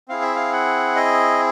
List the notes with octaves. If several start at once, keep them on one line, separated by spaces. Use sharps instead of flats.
C4 E4 G#4 F5
E5
F5
F#5
D#5